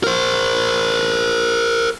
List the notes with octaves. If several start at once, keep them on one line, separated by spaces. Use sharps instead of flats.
A#4 C5